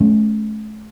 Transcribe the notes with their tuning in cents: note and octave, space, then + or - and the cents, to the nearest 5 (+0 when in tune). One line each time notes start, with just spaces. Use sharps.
A3 -40 C#4 +0